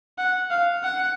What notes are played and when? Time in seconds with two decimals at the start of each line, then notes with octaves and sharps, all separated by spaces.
0.18 F#5
0.50 F5
0.84 F#5